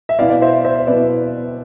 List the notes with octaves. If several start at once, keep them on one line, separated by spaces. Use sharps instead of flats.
E5
B2 B3 E4 D5 F5
D5
C5 E5
C5 E5
B2 B3 E4 B4 D5